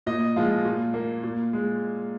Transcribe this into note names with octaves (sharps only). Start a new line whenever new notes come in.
A#2 D#5
F3 G#3 F4
A#2
A#3
A#2
G#3